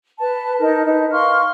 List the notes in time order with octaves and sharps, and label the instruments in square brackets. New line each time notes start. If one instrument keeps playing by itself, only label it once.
[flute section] B4 A5
D#4 A#4 A5
D#4 B4
F5 C6 C#6 F6